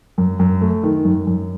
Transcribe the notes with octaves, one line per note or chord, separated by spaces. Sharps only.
F#2
F#2
A3
D#3
F#2
F#2